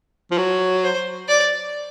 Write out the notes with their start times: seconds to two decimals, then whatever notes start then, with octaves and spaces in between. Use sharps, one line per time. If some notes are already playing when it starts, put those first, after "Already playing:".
0.31 F3
0.38 F#3
0.83 C5
1.28 D5